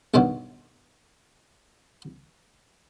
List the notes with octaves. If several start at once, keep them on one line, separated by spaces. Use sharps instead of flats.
B1 G2 B2 D#3 F#3